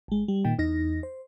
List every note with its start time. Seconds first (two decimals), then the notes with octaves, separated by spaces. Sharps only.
0.08 G#1 G#3
0.28 G3
0.45 A#2 D#3 G5
0.59 E2 D#4 A#6
1.03 C5